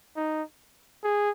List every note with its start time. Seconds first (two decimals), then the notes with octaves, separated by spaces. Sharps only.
0.16 D#4
1.04 G#4